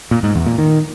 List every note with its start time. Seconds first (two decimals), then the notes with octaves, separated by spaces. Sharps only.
0.11 A#2
0.23 G#2
0.35 E2
0.46 A#2
0.58 D#3